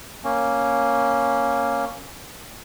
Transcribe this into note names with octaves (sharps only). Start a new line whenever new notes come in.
A#3 C#4